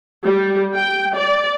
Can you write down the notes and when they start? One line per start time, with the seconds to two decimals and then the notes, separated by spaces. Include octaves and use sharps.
0.25 G3
0.75 G5
1.15 D5